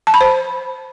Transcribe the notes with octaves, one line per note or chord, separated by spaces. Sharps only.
A5
B5
C5